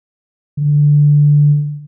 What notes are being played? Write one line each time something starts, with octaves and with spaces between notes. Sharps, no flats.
D3